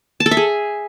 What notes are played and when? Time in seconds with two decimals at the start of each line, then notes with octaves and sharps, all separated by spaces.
0.20 A5
0.26 A4
0.31 E5
0.37 G#4